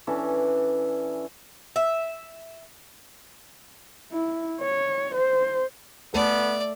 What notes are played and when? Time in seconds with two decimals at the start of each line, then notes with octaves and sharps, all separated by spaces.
0.07 E3 C#4 D4 A4
1.76 E5
4.12 E4
4.60 C#5
5.14 C5
6.14 A3 B3 A4 D5